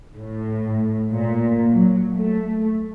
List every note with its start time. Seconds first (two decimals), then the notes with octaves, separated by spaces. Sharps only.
0.16 A2
1.12 A#2
1.70 F#3
2.14 A3